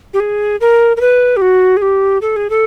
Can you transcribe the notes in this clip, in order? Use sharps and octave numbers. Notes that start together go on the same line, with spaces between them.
G4
G#4
A#4
A#4
B4
G4
F#4
G#4
G4
A4
G#4
A4